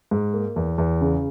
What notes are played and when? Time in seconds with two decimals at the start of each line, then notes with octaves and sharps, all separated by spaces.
0.11 G#2
0.33 A#3
0.56 E2
0.78 E2
1.01 C#3